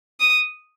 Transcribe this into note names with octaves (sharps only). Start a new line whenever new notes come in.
D#6